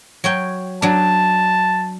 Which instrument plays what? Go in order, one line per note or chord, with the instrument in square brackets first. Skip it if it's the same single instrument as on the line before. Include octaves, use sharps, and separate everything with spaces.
[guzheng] F#3 C#5 G5
[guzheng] F#3 D4 [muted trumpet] A5